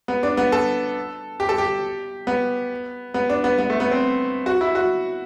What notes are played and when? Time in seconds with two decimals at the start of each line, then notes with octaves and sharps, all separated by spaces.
0.08 B3
0.23 D4
0.37 B3
0.52 A4
1.40 G4
1.49 A4
1.58 G4
2.27 B3
3.14 B3
3.30 D4
3.44 B3
3.59 B3
3.70 A3
3.80 B3
3.91 C4
4.46 F#4
4.61 E4
4.75 F#4